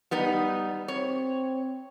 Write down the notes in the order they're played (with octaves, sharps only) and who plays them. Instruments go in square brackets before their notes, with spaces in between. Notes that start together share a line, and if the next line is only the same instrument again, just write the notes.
[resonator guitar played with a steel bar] G3 B3 D#4
[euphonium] C4 [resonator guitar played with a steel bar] C#5